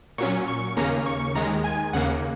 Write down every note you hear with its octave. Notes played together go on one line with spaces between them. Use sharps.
A#2 F#3 C#4 C#6
C#6
D#2 C#3 A#3 C#4 A#5
C#6
D#2 D#3 G#3 A#5
G#5
D#2 C#3 A#3 F#5